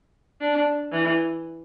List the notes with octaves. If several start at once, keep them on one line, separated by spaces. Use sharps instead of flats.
D4
E3